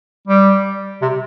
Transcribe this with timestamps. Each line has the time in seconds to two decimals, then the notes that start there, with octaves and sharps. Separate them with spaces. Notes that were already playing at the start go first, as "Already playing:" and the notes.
0.28 G3
1.02 C3